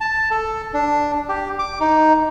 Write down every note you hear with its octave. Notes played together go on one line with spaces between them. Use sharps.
A5
A4
D4
G4
D6
D#4